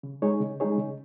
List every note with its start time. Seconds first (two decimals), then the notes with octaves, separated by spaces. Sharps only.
0.03 C#3
0.22 G#3 D#4 G#4 C#5
0.40 C#3
0.60 G#3 D#4 G#4 C#5
0.78 C#3